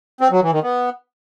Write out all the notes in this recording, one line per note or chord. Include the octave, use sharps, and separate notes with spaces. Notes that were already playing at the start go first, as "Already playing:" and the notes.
C4
F#3
E3
D#3
B3